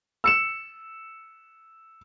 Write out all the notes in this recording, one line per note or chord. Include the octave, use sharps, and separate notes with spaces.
E6 C#7 E7